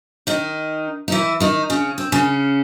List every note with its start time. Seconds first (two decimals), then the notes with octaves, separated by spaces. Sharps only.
0.27 D#3 D#4
1.08 D#4
1.12 E3 E4
1.40 D#3 D#4
1.70 C#3 C#4
1.98 C4
2.12 C#3 C#4